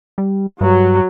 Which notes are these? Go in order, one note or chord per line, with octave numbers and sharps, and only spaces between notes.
G3
G2 F#3